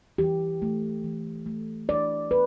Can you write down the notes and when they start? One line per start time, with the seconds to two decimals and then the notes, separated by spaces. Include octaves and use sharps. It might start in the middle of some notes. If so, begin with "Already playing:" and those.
0.18 E3 G4
0.62 A3
1.04 E3
1.46 A3
1.88 E3 D5
2.31 B4